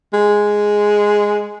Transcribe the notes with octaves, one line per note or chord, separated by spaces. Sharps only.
G#3